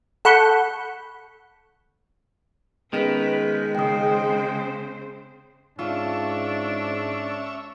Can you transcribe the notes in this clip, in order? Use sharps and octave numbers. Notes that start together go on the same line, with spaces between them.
A4 F#5 B5 C#6 G6
D#3 G#3 B3 C#4 B4 D7
C#3 C4 C5 G5 D#6
G#2 C#4 D4 F4 E5